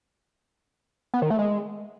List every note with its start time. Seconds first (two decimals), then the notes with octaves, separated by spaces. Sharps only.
1.14 B3
1.22 D#3
1.30 A3
1.39 G#3